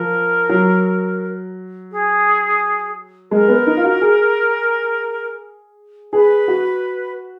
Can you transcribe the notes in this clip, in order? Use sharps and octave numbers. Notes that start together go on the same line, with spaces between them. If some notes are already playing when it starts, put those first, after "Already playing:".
Already playing: F3 A#4
F#3
G#4
G#3 A#4
B3
D#4
F4
F#4
G#4
G#4 B4
F#4